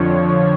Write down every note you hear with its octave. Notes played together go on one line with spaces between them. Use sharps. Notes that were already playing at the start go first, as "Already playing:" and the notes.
Already playing: F2 D3 F3 C#5